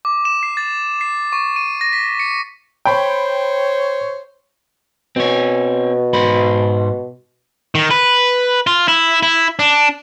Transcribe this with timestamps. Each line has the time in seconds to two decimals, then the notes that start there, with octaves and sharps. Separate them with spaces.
0.05 D6
0.25 E7
0.43 C7
0.57 A6
1.01 C7
1.33 C#6
1.56 D#7
1.81 A#6
1.93 B6
2.20 C#7
2.85 C5 C#5 G5 B5
5.16 B2 C4 C#5
6.13 G#2 C5 B5
7.75 D#3
7.91 B4
8.67 F4
8.88 E4
9.23 E4
9.59 D4